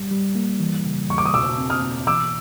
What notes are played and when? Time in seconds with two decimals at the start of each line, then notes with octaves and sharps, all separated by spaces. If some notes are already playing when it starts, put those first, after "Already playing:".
Already playing: G3
0.11 G3
0.35 A#3
0.60 E3
0.85 C#3
1.09 E2 C#6
1.18 D6
1.25 D#6
1.34 B2 D6 E6
1.58 C4
1.70 D#6 F6
1.82 B2
2.07 E3 D6 E6